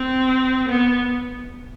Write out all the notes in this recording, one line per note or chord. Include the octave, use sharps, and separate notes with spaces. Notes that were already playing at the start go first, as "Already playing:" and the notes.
Already playing: C4
B3